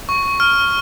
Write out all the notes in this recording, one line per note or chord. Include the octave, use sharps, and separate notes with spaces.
C#6
F6